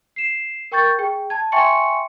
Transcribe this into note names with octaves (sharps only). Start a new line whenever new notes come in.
C7 E7
A#4 G5 C#6 G6 A6
G#4 G5
A5 G#6
E5 G5 G#5 C6 C#6 C#7